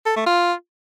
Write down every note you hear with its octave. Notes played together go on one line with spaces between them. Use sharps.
A4
A3
F4